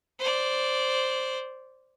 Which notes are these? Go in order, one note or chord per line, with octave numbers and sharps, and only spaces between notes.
C5 D5